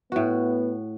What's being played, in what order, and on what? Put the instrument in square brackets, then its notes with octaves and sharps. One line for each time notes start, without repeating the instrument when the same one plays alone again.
[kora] A2 F#4 [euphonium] B3